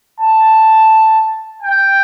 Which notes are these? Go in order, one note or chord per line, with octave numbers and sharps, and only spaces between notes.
A5
G5